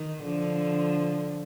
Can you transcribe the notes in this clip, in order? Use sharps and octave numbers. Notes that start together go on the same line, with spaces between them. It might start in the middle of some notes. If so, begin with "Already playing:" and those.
Already playing: D#3
D3 F3